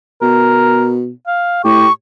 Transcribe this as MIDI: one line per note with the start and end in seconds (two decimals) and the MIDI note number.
0.22 1.10 47
0.22 0.95 70
1.27 1.62 77
1.64 1.86 45
1.64 1.88 67
1.64 1.92 85